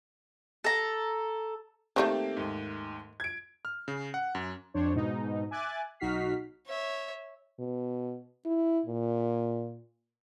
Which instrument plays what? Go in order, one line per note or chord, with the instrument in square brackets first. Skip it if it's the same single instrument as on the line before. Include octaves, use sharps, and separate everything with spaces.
[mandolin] A4 A#5
[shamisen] D#3 F3 A3 [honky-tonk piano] A#3 C4 G4
[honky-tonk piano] D#2 G#2
G#6 D7
[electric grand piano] F6
C#3
F#5
F#2
[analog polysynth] F2 D4 C5 C#5
G#2 B2 D#4
E5 G#5 D6 F#6 A6
B1 D#4 F#4 F6 B6 C7
[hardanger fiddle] C#5 E5
[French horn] B2
E4
A#2